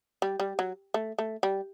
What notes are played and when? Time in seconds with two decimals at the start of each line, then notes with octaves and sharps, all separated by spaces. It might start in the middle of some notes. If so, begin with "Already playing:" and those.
0.22 G3
0.40 G3
0.59 F#3
0.94 A3
1.19 A3
1.43 G3